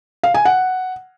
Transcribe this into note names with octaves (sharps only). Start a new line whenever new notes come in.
F5
G#5
F#5